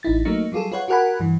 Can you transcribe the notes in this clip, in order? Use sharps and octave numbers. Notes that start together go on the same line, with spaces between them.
A1 D#4 E4 A6
F#3 A3 A#3 D#4 C#7
F#3 G3 F4 G#4 A4
F4 B4 C#5 F#5
F#4 G4 A#4 F#5 G#5 B5
G2 E3